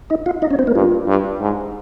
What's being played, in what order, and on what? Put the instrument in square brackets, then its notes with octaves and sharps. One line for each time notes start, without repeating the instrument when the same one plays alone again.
[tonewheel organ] D#4 D#5
F4 F5
D#4 D#5
C#4 C#5
C4 C5
A#3 A#4
[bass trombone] G2 [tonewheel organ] F4
[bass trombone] G2
G#2